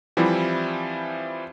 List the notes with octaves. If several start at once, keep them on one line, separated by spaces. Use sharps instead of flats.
E3 F3 G3 C4 E4